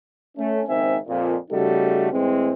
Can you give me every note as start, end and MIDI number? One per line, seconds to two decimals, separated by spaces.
0.37 0.61 57
0.37 0.61 61
0.68 0.98 30
0.68 0.98 44
0.68 0.98 51
0.68 0.98 60
0.68 0.98 76
0.68 0.98 80
1.07 1.36 41
1.07 1.36 46
1.51 2.10 49
1.51 2.10 55
1.51 2.10 57
1.51 2.10 63
1.51 2.10 66
1.51 2.10 69
2.12 2.53 45
2.12 2.53 52
2.12 2.53 56
2.12 2.53 60